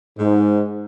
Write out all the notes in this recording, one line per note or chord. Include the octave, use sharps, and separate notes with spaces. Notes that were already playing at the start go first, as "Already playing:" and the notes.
G#2